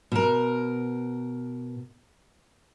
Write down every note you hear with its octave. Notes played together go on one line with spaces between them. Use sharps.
B2 A#4